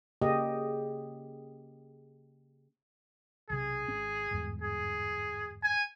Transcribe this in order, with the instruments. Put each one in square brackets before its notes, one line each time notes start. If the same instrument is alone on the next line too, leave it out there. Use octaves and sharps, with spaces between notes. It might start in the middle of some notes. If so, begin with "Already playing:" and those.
[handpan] C#3 A#3 G4 D#5
[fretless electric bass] B1 C3 [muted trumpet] G#4
[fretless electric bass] G#1 C#4
G1 E2 G#2
[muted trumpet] G#4
G#5